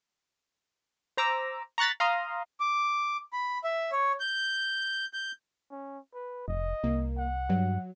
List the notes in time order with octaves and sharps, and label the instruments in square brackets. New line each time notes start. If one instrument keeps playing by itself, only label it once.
[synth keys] C5 A#5 D6 E6
A#5 C#6 F#6 A6 B6
F5 A#5 C6 D#6
[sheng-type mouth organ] D6
B5
E5
C#5
G6
G6
[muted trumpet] C#4
B4
[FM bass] F1 [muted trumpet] D#5
[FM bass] C2 [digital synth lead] A#3
[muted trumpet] F#5
[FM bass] G2 [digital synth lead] F#3